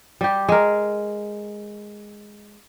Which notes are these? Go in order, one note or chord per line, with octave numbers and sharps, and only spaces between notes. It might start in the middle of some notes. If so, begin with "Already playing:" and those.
G3 G4
G#3 A#4